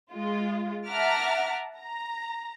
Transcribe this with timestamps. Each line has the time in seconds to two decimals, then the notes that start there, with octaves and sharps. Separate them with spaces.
0.13 G#3 F4
0.87 E5 F#5 A5 A#5 D6 F6
1.78 A#5